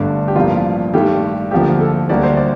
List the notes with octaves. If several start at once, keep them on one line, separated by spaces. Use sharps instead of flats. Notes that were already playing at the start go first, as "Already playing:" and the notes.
Already playing: G1 G2 D3 A3 D4
G4
A1 G2 F3 A#3 F4
G2 D#3 A3 G4
D2 D3 F3 A#3 G4
A4
D2 D3 G3 A#3 D5
C5
D5